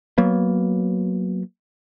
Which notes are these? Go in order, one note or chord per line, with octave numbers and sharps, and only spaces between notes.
F#3 A#3 B3